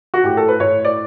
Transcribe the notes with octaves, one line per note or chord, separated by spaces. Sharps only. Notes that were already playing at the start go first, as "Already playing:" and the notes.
F#4
A2 G4
A4
B4
A2 C#5
D5